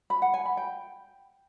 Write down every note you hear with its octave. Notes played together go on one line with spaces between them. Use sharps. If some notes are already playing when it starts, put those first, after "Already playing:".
B5
F#5
G#5
B5
G5